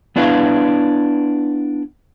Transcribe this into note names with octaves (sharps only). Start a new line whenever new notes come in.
B3 D4 E4 B4 F5